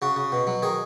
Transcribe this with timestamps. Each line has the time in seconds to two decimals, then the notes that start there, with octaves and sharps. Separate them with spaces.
0.02 C#3 F#4
0.16 C#3
0.32 B2
0.47 F#3
0.62 D#3 G#4